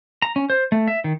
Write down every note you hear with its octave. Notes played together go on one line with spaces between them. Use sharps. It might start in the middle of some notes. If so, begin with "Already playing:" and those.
A#5
C#4
C5
A3
E5
D#3